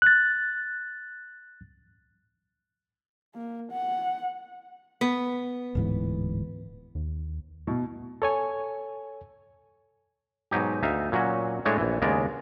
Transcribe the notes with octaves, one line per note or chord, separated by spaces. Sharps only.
F#6 A6
A#3
F#5
B3
D1 G#2 E3
D#2
B2 E4
A4 C#5 G#5
G#2 B2 F#3 D#4 G4
D2 D#4 E5 F5
A#2 F#3 C#4 F#4
A2 G#3 A3 D4 C#5 D#5
A#1 E3
D#2 C#3 G#3 B3 D5 A#5